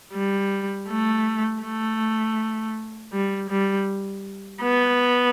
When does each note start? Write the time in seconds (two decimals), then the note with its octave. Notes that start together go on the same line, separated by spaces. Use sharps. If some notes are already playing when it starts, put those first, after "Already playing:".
0.14 G3
0.89 A3
1.63 A3
3.13 G3
3.50 G3
4.62 B3